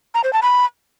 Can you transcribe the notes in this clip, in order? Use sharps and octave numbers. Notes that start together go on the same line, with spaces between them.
A#5
C5
A5
B5